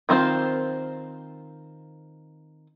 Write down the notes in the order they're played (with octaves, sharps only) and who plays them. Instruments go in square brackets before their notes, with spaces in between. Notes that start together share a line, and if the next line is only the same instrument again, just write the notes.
[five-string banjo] D#3 C4 F4 C5